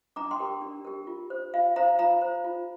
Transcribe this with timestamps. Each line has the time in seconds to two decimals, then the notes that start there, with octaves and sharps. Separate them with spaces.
0.16 D4 A#5 D6
0.31 G5 C6
0.40 G4 A#4
0.62 D4
0.85 G4 A#4
1.07 F4
1.30 C5
1.54 F4 F5
1.76 C5 F5 A#5
1.99 F4 F5 A#5
2.22 C5
2.44 F4